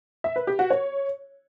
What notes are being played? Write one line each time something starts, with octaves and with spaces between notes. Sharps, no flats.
E5
B4
G4
F#4
C#5